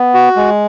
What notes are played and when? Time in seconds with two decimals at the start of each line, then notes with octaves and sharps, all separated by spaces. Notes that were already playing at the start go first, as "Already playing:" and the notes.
Already playing: B3
0.14 F#4
0.36 G#3